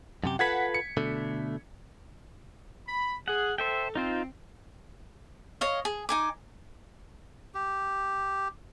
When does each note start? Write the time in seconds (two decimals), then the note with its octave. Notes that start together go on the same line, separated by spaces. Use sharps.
0.24 F#2 C3 G4
0.39 F4 A4 B4 F#5 G#6 B6
0.74 C#7
0.97 B2 D3 A3
2.87 B5
3.28 G#4 F#5
3.58 A4 C5 E5 G5
3.95 C4 D#4 F4 C5
5.61 C#5 D#5 F5
5.85 G#4
6.09 D#4 G#5 D6
7.55 G4